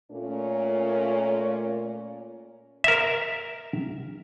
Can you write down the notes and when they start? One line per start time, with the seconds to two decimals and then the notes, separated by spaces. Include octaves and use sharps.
0.12 A#2 A3 C#4
2.84 A#4 E5